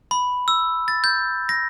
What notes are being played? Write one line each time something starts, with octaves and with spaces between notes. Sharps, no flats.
B5
E6
A6
G6
A#6